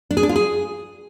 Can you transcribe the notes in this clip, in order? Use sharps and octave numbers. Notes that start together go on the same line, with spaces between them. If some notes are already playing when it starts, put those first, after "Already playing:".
D4
G#4
D4
F4
G#4